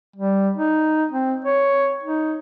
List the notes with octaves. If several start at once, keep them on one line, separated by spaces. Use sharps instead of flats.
G3
D#4
C4
C#5
D#4